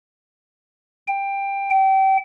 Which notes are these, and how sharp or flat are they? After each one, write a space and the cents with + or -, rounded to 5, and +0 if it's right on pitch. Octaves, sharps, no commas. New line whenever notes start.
G5 +15
G5 -30